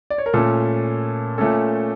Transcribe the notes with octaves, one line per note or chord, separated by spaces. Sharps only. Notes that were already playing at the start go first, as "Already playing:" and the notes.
D5
C#5
A#4
A#2 A3 C#4 A4
A#2 A3 C#4 A4